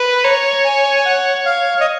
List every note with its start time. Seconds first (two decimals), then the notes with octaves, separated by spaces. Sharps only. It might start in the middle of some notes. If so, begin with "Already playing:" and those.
Already playing: B4
0.24 C#5 A#5
0.65 G#5
0.96 G#5
1.05 F#5
1.46 F5
1.81 D#5